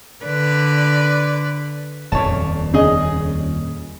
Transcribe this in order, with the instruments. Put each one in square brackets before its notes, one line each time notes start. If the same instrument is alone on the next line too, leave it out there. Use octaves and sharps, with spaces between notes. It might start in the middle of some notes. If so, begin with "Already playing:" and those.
[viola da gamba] D3 B4 D5
[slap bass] D#1 F2 A#2 [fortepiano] C#5 A5
[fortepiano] C#3 G#4 D#5